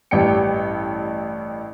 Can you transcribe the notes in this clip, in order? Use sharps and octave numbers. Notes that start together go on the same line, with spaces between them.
A1 G2 G4 G5 C#7